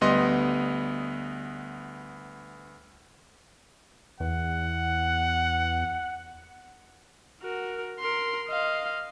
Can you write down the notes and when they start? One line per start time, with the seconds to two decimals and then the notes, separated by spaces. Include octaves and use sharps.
0.01 D2 G3 B3 D#5 C6
4.20 E2 F#5
7.41 F#4 A#4
8.00 A#4 C6
8.49 D#5 F5